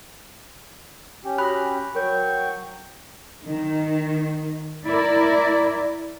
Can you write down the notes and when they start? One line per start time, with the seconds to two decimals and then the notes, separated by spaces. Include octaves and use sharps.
1.25 C#4 G4
1.38 F#4 B5 D#6 F#6 A#6
1.95 F#3 A#4 C#5 G5 C#6 G6
3.45 D#3
4.87 E4 A#4 D5